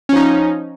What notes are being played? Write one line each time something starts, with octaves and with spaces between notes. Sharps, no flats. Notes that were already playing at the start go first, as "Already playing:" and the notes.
F3 C#4 D#4